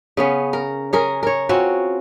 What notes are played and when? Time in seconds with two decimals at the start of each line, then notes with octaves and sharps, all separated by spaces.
0.17 C#3 B3 C#4
0.53 A#4
0.93 C#4 G#4 A#4
1.23 A#4 C#5
1.49 C4 C#4 F4 F#4